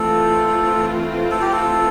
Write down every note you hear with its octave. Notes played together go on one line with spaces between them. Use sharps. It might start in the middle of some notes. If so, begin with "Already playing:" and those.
Already playing: E3 A3 C4 F4 A4
A4
G4
A4